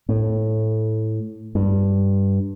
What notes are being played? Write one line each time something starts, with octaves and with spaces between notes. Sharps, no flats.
A2
G2